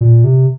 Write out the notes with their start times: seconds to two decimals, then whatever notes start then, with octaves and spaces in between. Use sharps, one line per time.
0.01 A#2
0.24 C3